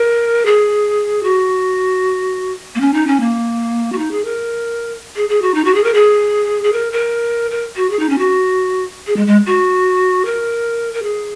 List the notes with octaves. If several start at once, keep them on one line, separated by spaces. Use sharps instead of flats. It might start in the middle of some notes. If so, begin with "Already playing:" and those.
Already playing: A#4
G#4
F#4
A#3
C#4
D#4
C#4
A#3
F#4
D#4
G#4
A#4
G#4
G#4
F#4
D#4
F#4
G#4
A#4
G#4
G#4
A#4
A#4
A#4
F#4
G#4
D#4
C#4
F#4
G#4
G#3
G#3
F#4
A#4
A#4
G#4